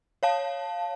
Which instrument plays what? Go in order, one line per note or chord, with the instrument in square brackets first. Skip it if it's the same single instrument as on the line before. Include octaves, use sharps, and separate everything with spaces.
[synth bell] C#5 F5 A5